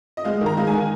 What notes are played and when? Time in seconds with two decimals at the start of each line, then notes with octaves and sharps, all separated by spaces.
0.17 D#5
0.25 G#3 F5
0.41 D#3
0.46 A#5
0.57 G#3 F5
0.67 G#5
0.73 D#3